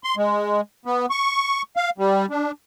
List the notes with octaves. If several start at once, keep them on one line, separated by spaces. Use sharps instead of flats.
C6
G#3
B3
C#6
F5
G3
D4